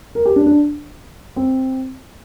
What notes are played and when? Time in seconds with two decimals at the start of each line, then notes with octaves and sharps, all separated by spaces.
0.15 A#4
0.26 G4
0.36 D4
0.46 D4
1.36 C4